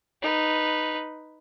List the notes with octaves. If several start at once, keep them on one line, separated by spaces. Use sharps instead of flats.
D#4 B4